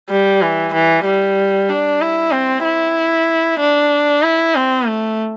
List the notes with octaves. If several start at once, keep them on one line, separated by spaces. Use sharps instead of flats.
G3
E3
E3
G3
D4
E4
C4
E4
D4
E4
C4
A3